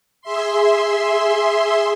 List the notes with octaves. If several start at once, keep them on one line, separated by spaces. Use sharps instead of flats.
G#4 E5 C6